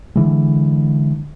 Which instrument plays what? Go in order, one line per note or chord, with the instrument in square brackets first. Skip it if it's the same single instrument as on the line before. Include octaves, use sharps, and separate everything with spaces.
[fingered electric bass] D3 E3 G#3